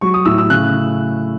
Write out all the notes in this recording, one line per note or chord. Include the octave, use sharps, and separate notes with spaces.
F#3 C#6
D#6
A2 E6
E6
C#3 F#6